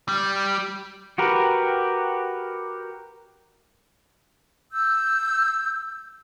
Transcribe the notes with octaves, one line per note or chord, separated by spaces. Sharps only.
G3
F#4 G4 A#4 B4
E6 G6